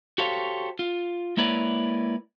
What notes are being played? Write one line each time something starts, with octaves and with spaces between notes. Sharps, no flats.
F#4 G4 A4 C5 C#5 F5
F4
G#3 A#3 E4 B4 C#5 D5